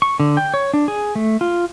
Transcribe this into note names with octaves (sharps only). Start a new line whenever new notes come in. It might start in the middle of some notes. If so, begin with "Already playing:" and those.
C#6
D3
G5
C#5
D4
G#4
A3
F4